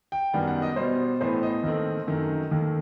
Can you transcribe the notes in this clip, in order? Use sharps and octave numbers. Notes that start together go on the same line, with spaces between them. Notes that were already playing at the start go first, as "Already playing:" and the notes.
G5
F#2 D#3 G3 B3 F#5
F#5
D#5
B2 G3 B3 C5
A2 E3 B3 C5
D#5
D#2 D#3 A3 C4
F#2 D#3 A3
D#2 D#3 A3